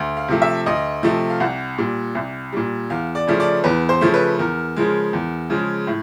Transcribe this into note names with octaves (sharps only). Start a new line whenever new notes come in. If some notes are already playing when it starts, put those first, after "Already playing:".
Already playing: D2
F5
C3 F3 A3
E5
D2 D#5
C3 F3 A3
F5
C2 F#5
A#2 G3
C2
A#2 G3
E2 F5
D5
C#3 F3 A3
D5
E2 B4
C5
C#3 F3 A3
B4
E2 A#4
C#3 F3 G#3
E2
C#3 F3 G#3
A2